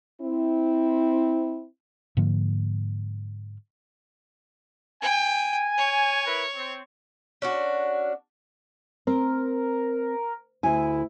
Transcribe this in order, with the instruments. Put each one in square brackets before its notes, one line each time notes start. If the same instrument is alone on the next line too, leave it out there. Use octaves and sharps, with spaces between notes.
[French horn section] C4 E4
[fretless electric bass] G#2 D3 F3 A#3
[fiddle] G5 [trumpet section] G#5
[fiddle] C#5
[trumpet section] E4 A#4 B4
C4
[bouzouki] C#4 D4 F#4
[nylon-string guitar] C4 [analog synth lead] A#4
[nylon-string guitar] D2 G#5 [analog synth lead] E4